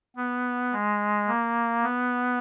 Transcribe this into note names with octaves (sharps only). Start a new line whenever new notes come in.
B3
G#3
A#3
B3